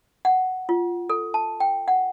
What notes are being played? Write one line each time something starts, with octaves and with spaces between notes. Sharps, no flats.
F#5
F4
A4
A5
G5
F#5